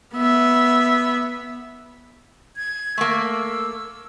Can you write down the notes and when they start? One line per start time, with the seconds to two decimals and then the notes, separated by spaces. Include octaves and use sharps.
0.14 B3 E5
2.57 G#6
2.98 A3 A#3 E6